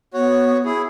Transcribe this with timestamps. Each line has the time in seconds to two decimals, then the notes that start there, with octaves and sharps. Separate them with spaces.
0.14 B3 F#4 C#5
0.65 E4 G#4